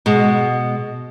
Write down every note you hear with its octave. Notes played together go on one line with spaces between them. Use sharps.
B2 G#3